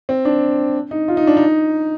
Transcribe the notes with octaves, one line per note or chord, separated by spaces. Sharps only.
C4
D4
D#4
F4
D#4
D4
D#4